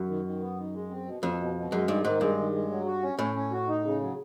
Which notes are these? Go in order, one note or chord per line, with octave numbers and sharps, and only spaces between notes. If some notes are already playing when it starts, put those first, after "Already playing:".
Already playing: F#2
D#3
D#3
B3
D#3
G#3
C4
B2
F2 B2
B2
B2
F#2 G#3
G2 D#3
G#2 D#3
G2 G#3
D#3
G#3
F#3
F#4
C#4
A2 C#4
C#4
F#4
D#4
C#3
F#3